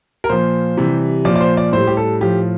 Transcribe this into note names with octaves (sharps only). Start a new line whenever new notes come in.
A#4
A#2 F3 C5
C3 E3 G3
A#2 F3 D5
D5
C5
D5
A2 G3 C5
G4
A4
A2 F3 G4